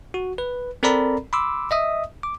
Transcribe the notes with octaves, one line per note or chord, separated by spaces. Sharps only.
F#4
B4
C4 A4 A#4 D5 A#5 B5
B5 C6 D6 E6
D#5 E5 D#6
D6